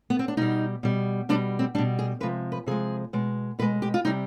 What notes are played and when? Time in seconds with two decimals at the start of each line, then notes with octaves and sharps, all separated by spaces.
0.10 B3
0.19 C4
0.28 D4
0.37 B2 G3 D#4
0.83 B2 G3
1.29 B2 G3 D4
1.59 C4
1.75 G3 D4
1.78 B2
1.99 G#4
2.20 C3 F3 G#3 B4
2.52 B4
2.66 C3 F3 G#3 G#4
3.13 B2 G#3
3.59 B2 G#3 B4
3.82 G4
3.94 F4
4.05 C3 G3 D#4